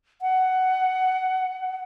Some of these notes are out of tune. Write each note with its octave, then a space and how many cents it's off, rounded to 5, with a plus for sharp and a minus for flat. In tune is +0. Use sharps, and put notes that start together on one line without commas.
F#5 +15